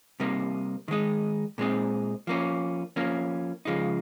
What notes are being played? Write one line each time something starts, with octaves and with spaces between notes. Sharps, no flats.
C3 G3 A#3 D#4
D#3 G#3 D#4
A#2 G#3 C4 D#4
F3 A#3 C#4
F3 A#3 C#4
C#3 F3 G#3 D#4